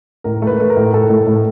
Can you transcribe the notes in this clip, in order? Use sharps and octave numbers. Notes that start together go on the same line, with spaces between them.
A2 A#4
A3
B4
A3
A#4
A2
A2 A4
A2
A2